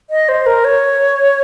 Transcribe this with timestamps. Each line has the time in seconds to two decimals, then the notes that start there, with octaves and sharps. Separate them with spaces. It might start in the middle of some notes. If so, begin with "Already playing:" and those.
0.10 D#5
0.29 C5
0.46 A#4
0.64 C#5